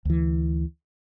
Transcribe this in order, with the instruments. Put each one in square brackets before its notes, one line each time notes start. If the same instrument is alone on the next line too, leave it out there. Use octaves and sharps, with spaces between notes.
[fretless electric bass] D2 E3